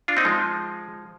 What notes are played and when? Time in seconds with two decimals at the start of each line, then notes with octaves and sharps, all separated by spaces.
0.08 D4 F4
0.17 C4 D#4
0.25 F3 G#3